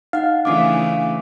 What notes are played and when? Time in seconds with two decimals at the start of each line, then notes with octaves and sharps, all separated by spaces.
0.13 D#4 F5 F#5
0.45 C#3 E3 A3 D4 D6